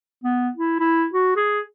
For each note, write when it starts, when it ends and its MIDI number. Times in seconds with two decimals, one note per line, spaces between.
0.24 0.49 59
0.56 0.80 64
0.80 1.05 64
1.14 1.35 66
1.37 1.61 68